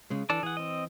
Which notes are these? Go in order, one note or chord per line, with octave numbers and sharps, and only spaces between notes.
C#3 G#3
E3 D4 A4 D5
E3 G#4 F#5
C4 D#5